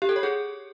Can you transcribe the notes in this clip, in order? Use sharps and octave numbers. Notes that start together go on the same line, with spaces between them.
G4
A4
C#5
G#4